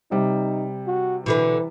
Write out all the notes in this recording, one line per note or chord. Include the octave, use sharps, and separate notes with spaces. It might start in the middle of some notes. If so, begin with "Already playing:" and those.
C3 G3 D#4
F#4
B2 D3 E3 B4